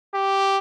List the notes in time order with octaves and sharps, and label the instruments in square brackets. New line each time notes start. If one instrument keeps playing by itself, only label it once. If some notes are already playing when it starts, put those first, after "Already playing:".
[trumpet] G4